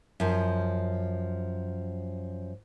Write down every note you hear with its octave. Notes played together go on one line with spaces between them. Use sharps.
F#2 F3